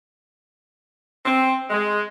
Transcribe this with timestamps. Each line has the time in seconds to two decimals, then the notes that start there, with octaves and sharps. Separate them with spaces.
1.26 C4
1.70 G#3